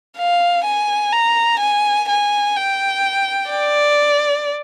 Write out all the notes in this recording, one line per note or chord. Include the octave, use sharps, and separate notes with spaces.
F5
G#5
A#5
G#5
G#5
G5
D5